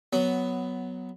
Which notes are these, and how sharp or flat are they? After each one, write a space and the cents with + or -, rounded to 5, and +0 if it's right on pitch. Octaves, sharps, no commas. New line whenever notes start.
F#3 +0 B3 +10